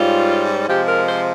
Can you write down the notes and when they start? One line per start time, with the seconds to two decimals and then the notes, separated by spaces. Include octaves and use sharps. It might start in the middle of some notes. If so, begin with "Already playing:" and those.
Already playing: G#2 G3 C#4 F4
0.68 C3 F3 G#3 G4
0.87 A#4
1.07 C5